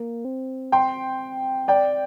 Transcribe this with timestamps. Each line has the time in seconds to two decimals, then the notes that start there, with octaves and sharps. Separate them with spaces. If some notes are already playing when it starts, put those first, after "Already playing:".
Already playing: A#3
0.25 C4
0.72 G5 C6
1.68 D5 G5